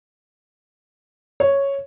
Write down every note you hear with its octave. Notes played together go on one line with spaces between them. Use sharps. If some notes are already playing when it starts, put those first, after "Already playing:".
C#5